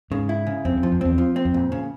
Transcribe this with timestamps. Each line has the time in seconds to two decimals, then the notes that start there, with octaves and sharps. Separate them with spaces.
0.11 G#2 C#3
0.29 E4
0.47 C#3
0.65 F2 C4
0.78 F2
0.83 F3
0.92 F2
1.01 E2 C4
1.18 F3
1.36 C4
1.45 F2
1.54 A#2
1.72 C#3